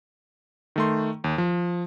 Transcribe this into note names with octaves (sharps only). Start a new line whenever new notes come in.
D#3 A3 C6
D#2
F3